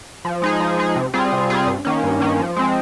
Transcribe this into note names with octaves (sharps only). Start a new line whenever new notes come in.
F3
G#3 D#4 G#4
F3
G#3 D#4 G#4
C3
G3 C4 F4 G#4
C3
G3 C4 F4 G#4
G2
D#3 A#3 C#4
G2
D#3 A#3 C#4
F3
G#3 C4